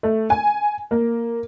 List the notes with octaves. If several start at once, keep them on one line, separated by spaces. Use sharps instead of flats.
A3
G#5
A#3